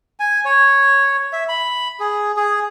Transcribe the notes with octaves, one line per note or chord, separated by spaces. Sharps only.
G#5
C#5
E5
B5
G#4
G#4